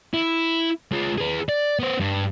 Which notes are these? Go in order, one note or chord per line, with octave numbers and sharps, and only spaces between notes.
E4
G#3 F4
G#4 B4
D5
B3 C5
G2